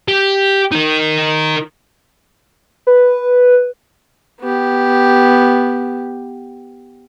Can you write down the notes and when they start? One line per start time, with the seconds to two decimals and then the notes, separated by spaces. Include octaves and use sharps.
0.08 G4
0.72 D#4 A#4
2.87 B4
4.41 B3 G4